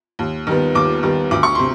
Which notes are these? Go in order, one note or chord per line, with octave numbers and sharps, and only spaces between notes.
D#2
D#3 G3 B3
D#2 D6
D#3 G3 B3
D2 D6
C#6
C3 C6